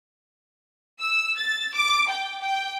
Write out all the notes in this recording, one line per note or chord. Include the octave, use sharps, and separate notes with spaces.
E6
A6
D6
G5
G5